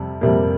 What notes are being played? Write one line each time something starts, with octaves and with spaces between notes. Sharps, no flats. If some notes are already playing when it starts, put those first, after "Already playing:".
Already playing: F2 C3 G3
F2 C3 G3 A#3